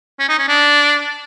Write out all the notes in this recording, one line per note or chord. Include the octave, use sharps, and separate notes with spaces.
C#4
D#4
C#4
D4